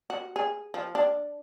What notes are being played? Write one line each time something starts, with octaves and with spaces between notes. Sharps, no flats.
F#4
G#4
F3
D4